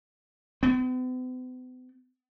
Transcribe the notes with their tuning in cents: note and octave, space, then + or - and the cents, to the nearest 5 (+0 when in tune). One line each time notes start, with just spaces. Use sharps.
B3 +45